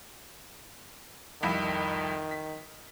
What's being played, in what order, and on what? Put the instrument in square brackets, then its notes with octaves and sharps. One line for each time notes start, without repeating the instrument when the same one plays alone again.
[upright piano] C2 F2 B5 [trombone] D#3
[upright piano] B6